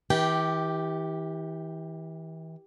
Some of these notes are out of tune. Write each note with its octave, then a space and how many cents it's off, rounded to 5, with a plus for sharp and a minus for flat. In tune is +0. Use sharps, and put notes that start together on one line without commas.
E3 -35 G4 +0 G5 -20